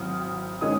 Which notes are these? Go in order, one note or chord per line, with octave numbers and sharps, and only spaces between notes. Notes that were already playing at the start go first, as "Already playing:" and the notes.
Already playing: G#1 F#3 C4 D#6 F6
D#3 G#3 C#4 D#6